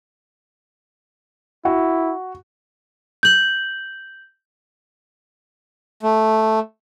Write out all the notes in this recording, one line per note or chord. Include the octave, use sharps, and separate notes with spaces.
E4 F#4
G6 F#7
A3